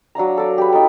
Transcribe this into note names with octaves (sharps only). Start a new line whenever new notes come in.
F#3 D4 F5 A#5
A4 D5
G4 B4
D#4 F4 A4 D6